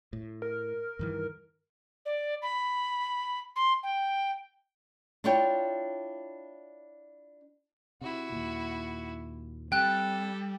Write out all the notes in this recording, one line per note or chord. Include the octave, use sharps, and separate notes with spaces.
A2
A#4
G2 D#3 E3
D5
B5
C6
G5
D4 E4 F4 C#5 G5
C3 E4 F#4
D#2 A#2
G3 C4 A4 G5 F#6